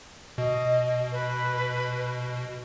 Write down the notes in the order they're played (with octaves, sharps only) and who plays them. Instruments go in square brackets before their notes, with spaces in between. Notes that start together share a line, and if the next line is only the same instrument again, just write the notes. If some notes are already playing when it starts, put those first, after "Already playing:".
[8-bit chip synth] B2 [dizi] D#5
[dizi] B4